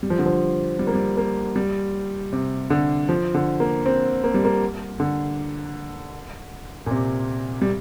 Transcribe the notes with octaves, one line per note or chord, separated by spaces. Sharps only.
G3
F3
D3
F3
G3
A#3
G3
A#3
G3
C3
D3
F3
D3
A#3
C4
A#3
G3
A#3
D3
A#2
C3
G3